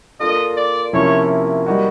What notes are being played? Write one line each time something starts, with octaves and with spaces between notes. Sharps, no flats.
A#3 D4 F4 A4 D#5
D5
C3 F3 A#3 C#4 E4 C#5
G3 A#3 D#4 F#4